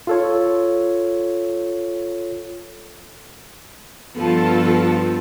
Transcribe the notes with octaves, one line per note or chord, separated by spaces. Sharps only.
F4 A4 C#5
G2 F3 B3 F4 A4 A5